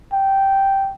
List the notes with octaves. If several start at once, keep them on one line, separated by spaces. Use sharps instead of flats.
G5